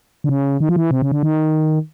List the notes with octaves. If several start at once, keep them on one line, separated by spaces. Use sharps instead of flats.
D3
C#3
D#3
F3
E3
C3
C#3
D3
D#3